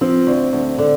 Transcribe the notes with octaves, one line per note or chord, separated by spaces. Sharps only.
F3 C4
D2
D2
D3